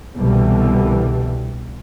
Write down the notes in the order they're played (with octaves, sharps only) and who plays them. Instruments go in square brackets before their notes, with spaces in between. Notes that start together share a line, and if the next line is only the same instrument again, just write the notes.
[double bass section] C2 B2 D3 E3 G3